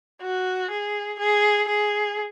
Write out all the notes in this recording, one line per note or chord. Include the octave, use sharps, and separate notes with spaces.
F#4
G#4
G#4
G#4